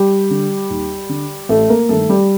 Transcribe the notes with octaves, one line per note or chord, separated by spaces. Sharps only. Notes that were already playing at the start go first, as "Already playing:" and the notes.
Already playing: G3 G4
D3
D#2
D3
A1 A3 A4
A#3 A#4
G2 D#3 A3 A4
G3 G4